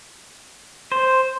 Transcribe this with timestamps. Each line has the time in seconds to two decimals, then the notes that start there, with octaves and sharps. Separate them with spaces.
0.92 C5